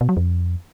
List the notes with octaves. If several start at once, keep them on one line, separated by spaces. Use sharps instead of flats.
B2
F#3
F2